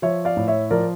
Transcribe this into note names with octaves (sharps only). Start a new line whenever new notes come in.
F3 C#5 E5
D5 F5
A2
C#5 E5
F3 A#4 D5